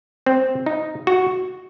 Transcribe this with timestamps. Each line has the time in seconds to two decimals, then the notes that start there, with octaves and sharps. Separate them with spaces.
0.26 C4
0.66 D#4
1.07 F#4